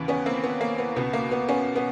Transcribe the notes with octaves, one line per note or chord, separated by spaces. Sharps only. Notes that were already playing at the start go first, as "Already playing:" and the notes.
Already playing: D#2 C#3 E3
B3 C#4
A#3 C4
B3
A#3
B3
C#2 B2 B3
A#3
B3
B3 C#4
B3